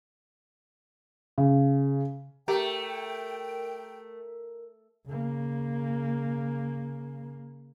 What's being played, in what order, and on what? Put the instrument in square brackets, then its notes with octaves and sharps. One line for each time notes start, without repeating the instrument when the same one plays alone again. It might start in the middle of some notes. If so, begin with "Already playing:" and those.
[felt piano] C#3
[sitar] A3 [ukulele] G4 [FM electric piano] A#4 [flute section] G5
[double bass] C#3 A#3